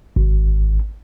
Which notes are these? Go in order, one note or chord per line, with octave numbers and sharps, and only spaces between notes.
G#1